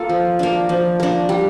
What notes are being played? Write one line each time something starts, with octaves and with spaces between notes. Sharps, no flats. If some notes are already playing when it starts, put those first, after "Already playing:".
Already playing: A#3 F4 A4
F3
A#3 D4
F3
A#3 D4
G3